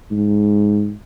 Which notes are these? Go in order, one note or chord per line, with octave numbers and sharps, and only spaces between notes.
G#2